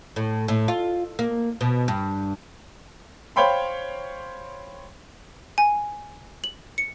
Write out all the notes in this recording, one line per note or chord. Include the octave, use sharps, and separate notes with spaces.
A2
A2
F4
A#3
B2
G2
C5 C#5 F5 G5 B5 C6
G#5
F#7
C#7